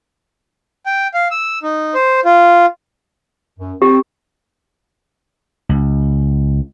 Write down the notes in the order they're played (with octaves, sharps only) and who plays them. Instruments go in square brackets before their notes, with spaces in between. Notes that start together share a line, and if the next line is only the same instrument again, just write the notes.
[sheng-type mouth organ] G5
F5
E6
D#4
C5
F4
[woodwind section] F#2
[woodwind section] C4 [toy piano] G4
[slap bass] C#2